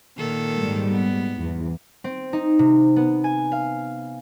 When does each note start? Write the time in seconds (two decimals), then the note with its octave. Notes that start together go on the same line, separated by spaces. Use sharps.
0.17 A#2 D#3 A4
0.56 G#2 G3
0.91 B3
1.38 E2
2.04 C4
2.33 D#4
2.59 C3
2.96 B3
3.24 G#5
3.52 F5